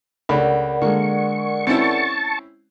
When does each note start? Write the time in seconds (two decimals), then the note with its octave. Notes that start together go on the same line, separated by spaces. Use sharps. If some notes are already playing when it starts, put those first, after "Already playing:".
0.29 C#2 A3 D4 A#4 D5 F#5 B5
0.82 D3 G#3 A#3 C#6
1.67 C4 C#4 E4 A5 C#6